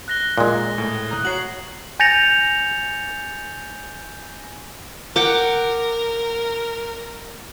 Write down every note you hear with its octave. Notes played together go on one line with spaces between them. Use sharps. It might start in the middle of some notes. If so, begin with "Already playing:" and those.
F#6 A#6 G7
A#2 G#3
A2
A#5 D#6 F#6
F#4 C#5 C7 F#7
G#5 G6 A6 A#6 C#7 F7
A#4 F#5 G5 D6